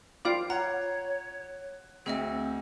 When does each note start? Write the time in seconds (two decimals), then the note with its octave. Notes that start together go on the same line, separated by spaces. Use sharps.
0.25 F4 D5 F5 G5 B5 D6
0.50 C#5 F#5 A#5
2.06 D2 C4 G#4 D#5 E5